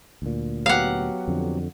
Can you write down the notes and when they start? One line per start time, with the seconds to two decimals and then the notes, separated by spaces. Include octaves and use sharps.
0.22 D2 A#2
0.66 F#3 B3 G4 F5 F#5
1.28 F2 D3